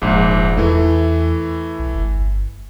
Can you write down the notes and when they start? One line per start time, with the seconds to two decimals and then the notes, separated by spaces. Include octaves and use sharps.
0.02 E1 A#1 G#2
0.57 E2 E3 A3
1.79 B1
1.94 G1